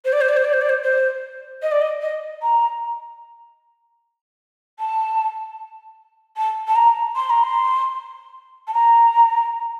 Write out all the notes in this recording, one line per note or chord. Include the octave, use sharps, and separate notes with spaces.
C5
D5
C5
D5
C5
D5
C5
D5
C5
C5
D#5
D5
D#5
D#5
A#5
A5
A5
A5
A#5
C6
A#5
C6
A5
A#5